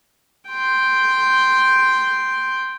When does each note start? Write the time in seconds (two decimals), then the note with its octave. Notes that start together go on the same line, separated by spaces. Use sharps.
0.50 G5 C6